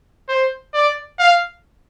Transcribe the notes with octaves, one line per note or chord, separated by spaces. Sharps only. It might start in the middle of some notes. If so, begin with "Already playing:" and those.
C5
D5
F5